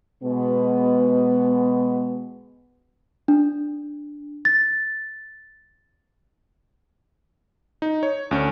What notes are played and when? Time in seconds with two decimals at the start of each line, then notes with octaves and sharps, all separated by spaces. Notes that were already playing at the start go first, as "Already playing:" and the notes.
0.22 B2 G#3 B3
3.28 D4
4.45 A6
7.82 D#4
8.03 C#5
8.31 D2 C#4 D4